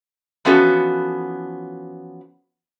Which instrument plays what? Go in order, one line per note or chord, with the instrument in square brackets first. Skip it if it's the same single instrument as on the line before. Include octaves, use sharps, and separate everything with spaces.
[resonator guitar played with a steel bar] E3 F3 B3 C#4 F#4 A4